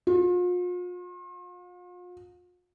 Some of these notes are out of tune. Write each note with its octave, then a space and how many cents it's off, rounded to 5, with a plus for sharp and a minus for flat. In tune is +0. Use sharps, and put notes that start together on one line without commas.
F4 +40